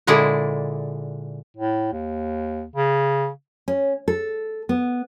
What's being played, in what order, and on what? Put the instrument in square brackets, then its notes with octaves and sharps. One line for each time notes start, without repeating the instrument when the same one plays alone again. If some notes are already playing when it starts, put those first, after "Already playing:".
[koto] A#2 D3 G#3 E4 G#4 D5
[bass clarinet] A2
D#2
C#3
[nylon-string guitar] C#4
A4
B3